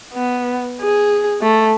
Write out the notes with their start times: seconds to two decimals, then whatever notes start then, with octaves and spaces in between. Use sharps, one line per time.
0.13 B3
0.81 G#4
1.41 A3